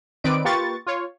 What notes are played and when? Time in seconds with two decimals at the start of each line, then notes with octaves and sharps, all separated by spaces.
0.24 D#3 C4 B4 D5 D#5 D7
0.45 A#3 F4 G4 B4 C#6 A6
0.86 F4 C#5